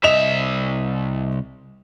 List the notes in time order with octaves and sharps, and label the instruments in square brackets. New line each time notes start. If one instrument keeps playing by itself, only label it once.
[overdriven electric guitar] C2 E5 [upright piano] D#5 E7 F7